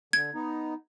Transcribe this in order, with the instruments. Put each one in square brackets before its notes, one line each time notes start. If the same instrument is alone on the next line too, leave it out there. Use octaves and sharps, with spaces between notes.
[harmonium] D3 [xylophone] G#6
[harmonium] B3 D#4